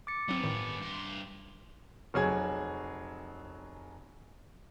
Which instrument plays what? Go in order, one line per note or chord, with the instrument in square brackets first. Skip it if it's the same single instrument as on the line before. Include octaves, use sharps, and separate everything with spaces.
[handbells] D6 A6 C#7
[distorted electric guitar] G2 B3 [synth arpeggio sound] F#3 C4
[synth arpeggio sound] A2 D#3
[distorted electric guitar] G2 C6
[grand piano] F1 F#3 G#4 G#6